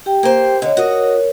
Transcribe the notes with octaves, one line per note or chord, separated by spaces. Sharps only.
G4 G5
A#3 C5
D3 C#5 D#5
F#4 A#4 C#5 D#5